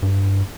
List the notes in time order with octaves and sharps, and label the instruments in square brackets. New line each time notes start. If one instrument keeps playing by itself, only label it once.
[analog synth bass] G2